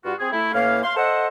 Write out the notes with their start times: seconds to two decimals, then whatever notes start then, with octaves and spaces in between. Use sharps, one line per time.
0.04 G2 F4 F#4
0.19 C4 G#4
0.32 A3 E4
0.54 A2 E3 A#3 C#4 F5
0.83 F5 C6
0.96 A4 C5 D#5 E5 F#5